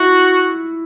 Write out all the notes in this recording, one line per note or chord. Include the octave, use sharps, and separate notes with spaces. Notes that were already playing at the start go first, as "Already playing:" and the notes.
Already playing: E4 F#4